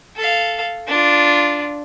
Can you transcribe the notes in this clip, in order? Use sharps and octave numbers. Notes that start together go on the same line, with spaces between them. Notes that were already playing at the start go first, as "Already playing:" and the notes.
A4 F5
D4 F4